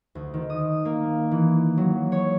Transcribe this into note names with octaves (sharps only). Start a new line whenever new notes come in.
D2
D#3
D#6
A#3
E3
F#3
C#5